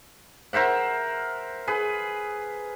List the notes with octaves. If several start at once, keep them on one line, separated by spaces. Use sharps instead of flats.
A#4 C5 E5 F#5
G#4 B4